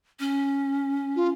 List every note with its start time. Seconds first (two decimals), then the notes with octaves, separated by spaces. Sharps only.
0.19 C#4
1.16 F4